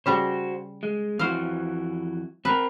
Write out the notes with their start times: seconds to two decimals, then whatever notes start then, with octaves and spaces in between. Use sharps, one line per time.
0.06 C#3 G3 F#4 C5 A#5
0.83 G#3
1.19 F2 E3 F#4 C5 F5
2.45 C4 A#4 B4